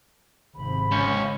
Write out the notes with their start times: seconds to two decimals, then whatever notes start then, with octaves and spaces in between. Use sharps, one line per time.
0.56 G#1 C3 B5
0.91 C#2 C#4